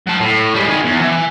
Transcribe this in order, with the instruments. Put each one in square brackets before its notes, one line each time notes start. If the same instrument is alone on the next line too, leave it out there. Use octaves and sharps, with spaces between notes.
[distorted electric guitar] F#3 A5
A2
G3 G#3
D#3 G#4
E2
E3